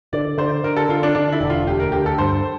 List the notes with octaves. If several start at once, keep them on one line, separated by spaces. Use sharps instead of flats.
D3 D5
D3 C5
D3 A#4
A4
D3 F4
D4
D3 D4
E4
E1
F4
D2 G4
A#4
D3 G4
A4
G2 C5